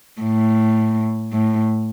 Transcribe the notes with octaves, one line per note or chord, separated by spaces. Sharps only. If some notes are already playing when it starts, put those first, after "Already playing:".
A2
A2